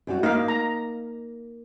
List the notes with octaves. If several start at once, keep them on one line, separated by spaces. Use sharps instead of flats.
F#2 G3 F#4
A#3 D#4 F5
A#5